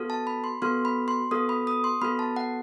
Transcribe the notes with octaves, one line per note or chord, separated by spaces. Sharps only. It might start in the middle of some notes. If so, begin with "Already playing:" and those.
Already playing: B3 F#4 A4
A5
B5
C6
B3 F#4 A4 C6
B5
C6
B3 F#4 A4 D#6
B5
D#6
C6
B3 F#4 A4 B5
A5
F#5